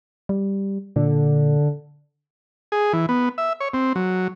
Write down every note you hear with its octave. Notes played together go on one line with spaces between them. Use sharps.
G3
A#2 D3
G#4
E3
B3
E5
C#5
C4
F#3